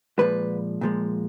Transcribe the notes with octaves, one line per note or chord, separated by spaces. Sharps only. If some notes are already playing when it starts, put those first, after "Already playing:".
A#2 F3 G#3 B4
A#2 F3 G#3